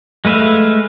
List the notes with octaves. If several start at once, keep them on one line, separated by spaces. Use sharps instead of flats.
G#3 A3 B4 E5 F5